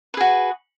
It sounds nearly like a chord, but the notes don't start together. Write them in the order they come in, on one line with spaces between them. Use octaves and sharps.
B4 G#4 F#4